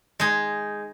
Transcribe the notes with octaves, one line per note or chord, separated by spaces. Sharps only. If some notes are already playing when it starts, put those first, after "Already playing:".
G#3 D#4 G#4